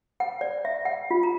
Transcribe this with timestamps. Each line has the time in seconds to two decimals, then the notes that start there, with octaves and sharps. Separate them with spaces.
0.20 F#5
0.41 D5
0.65 E5
0.85 F#5
1.11 F4
1.23 A#5